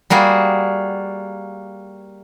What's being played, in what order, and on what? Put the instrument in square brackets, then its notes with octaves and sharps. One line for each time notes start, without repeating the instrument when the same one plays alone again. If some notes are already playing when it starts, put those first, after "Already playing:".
[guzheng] G3 A#3 F#4 G#4